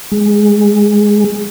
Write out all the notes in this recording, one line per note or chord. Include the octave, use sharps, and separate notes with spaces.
G#3